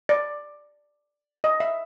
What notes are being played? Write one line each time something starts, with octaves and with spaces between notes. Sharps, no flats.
D5
D#5
E5